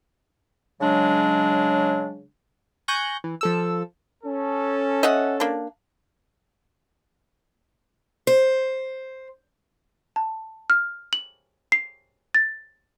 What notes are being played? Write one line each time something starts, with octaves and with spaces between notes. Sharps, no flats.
C#3 F#3 G#3 D4
G#5 C#6 F#6 G6 A#6
E3
F3 A4 E6
C#4 A4
D#5 E5 F#5
A#3 D4
C5
A5
F6
F#7
C7
A6